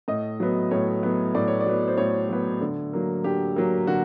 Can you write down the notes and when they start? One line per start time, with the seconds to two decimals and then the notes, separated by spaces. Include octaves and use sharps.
0.08 A2 D#5
0.40 F#3 B3
0.71 A2 C#5
1.03 F#3 B3
1.35 A2 D5
1.48 C#5
1.61 D5
1.66 F#3 B3
1.88 C5
1.97 A2 C#5
2.29 F#3 B3
2.61 D3
2.93 F#3 A#3
3.24 D3 G4
3.56 F#3 A#3
3.87 D3 F#4